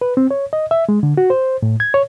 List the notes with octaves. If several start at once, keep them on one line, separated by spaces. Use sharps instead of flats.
B4
C4
C#5
D#5
E5
G#3
D3
F#4
C5
A2
G#6
C#5